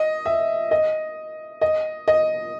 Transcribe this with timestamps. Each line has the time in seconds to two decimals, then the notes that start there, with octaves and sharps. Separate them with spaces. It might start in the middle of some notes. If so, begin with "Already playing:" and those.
Already playing: D#5
0.26 E5
0.71 D#5
1.61 D#5
2.08 D#5